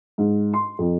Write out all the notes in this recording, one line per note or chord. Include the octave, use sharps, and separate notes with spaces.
G#2
C6
F2